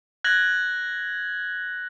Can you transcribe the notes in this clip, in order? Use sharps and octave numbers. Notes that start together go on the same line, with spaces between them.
F#6 G#6 A#6 F#7